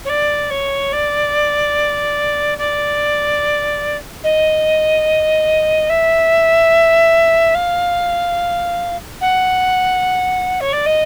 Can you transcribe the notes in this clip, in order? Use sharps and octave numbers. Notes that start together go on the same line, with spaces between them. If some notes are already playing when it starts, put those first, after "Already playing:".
C#5
D5
C#5
D5
D5
D#5
E5
F5
F#5
C#5
D5
D#5